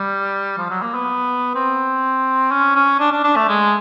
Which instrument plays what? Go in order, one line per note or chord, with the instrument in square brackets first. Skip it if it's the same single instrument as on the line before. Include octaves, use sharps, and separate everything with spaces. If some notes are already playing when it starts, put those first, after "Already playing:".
Already playing: [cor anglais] G3
F3
F#3
A#3
B3
C4
C#4
C#4
D4
D4
D4
A3
G#3